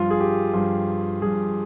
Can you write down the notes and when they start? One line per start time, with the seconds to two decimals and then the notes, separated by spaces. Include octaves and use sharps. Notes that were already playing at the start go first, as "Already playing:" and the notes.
Already playing: G2 F3 F4
0.10 G#4
0.20 G4
0.54 G2 F3 F4
1.22 G2 F3 G#4